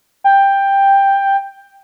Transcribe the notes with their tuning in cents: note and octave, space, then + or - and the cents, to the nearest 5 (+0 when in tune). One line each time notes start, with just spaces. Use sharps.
G5 +10